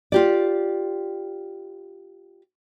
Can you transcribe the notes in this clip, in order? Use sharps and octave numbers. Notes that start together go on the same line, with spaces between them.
F4 G4 D5